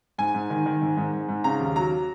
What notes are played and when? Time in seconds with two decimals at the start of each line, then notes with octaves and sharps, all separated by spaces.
0.18 G#2 G#5
0.34 G#2
0.50 D#3
0.66 D#3
0.82 G#2
0.97 G#2
1.13 G#2
1.29 G#2
1.44 C#3 A#5
1.60 D#2
1.76 F#3 A#5